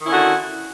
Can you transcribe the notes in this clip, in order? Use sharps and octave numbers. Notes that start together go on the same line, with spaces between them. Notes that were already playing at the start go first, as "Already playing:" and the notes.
D3 D#3 C#4 E4 F#4